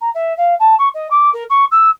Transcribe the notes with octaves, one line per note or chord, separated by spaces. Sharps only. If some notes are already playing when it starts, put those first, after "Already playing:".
A#5
E5
F5
A5
C#6
D#5
D6
A#4
C#6
E6